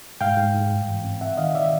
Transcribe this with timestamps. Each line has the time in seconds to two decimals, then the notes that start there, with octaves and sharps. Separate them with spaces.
0.21 G#2 F5 G5
0.37 G#2
0.54 G#2
0.71 G2
0.88 E3
1.04 C4
1.21 C4 E5 F#5
1.37 D#3 D#5 F5
1.55 D#3 D5 E5